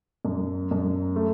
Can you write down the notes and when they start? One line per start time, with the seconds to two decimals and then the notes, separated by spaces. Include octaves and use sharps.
0.25 F#2
0.71 F#2
1.16 A3